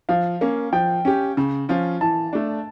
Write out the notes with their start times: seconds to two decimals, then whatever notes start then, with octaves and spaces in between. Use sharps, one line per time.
0.09 F3 F5
0.41 A#3 C#4
0.73 F3 G5
1.05 C#4 G4
1.37 C#3
1.69 F3 C#4 F4
2.01 E3 A5
2.33 A3 D4